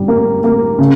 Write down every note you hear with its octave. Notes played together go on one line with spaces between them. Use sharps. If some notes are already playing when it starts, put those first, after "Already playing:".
Already playing: G3
A#3
A#3
C#3